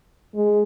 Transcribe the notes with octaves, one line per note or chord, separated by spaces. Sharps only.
G#3